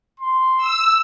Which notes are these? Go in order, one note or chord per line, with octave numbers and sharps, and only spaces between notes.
C6
E6